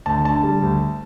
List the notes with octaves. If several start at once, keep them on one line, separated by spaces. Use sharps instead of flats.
D2 A5
D3 A5
G3
D2